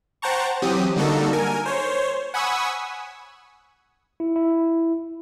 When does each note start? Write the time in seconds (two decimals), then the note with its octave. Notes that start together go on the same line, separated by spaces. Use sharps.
0.22 C5 F#5 G5 A5 A#5 C#6
0.62 E3 F#3 C4 G4 D#6
0.96 D3 G3 A#3 D#4 F#4 A4
1.33 A#4 G#5
1.66 C5 C#5
2.34 F#5 G#5 B5 C#6 D#6 E6
4.20 E4
4.36 E4